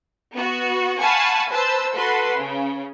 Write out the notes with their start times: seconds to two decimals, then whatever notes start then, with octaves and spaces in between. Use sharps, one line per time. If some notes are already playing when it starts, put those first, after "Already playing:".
0.34 B3 F#4
0.98 F5 F#5 G#5 A5 B5 C#6
1.50 B4 C5 A5 E6
1.93 F#4 A4 B4 C6
2.37 C#3